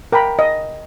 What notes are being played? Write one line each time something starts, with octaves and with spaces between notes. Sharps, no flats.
A#4 G5 A#5 B5
D#5